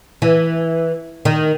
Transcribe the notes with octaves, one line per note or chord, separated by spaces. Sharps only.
E3
D#3